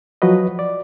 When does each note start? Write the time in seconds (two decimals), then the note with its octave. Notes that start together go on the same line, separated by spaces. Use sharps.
0.22 F3 F#3 F#4 B4 D#5
0.59 D5